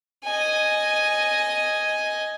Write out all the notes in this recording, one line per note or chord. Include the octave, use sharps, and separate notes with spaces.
D#5 G#5